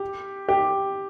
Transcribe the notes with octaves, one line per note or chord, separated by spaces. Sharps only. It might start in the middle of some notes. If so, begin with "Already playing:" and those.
Already playing: G4
G4